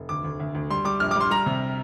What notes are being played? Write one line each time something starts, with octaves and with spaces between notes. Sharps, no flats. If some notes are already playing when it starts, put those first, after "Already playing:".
Already playing: F1
D2 D6
D2
D2
D2
G3 C6
G3 D6
A#1 F6
D6
G3 C6
G3 A#5
C3